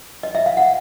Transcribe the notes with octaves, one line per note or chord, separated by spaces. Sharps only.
D#5
E5
F5
F#5